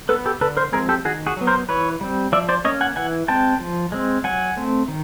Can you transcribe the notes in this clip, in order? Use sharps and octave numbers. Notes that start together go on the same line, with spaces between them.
B3 A4 B4
G4 A4
D3 A4 B4
A#4 C5
F3 G#3 C4 G#4 A#4
G4 A4
D#3 F#4 G#4
F#4 G#4
F#3 B3
A#4 C5
E3 B4 C#5
G3 C4
F3 D5 E5
C5 D5
A#3 C#4 C#5 D#5
F#5 G#5
E3 F#5 G#5
G#3 C4 G5 A5
F3
G#3 C4
F#3 F#5 G#5
A3 C4
D#3